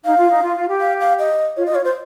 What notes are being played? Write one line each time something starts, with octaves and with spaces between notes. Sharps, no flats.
D#4 F5
F4
D#4
F4
F4
G4
F5
F5
D#5
F4 C#5
D#5
F4
C#5
F4 C5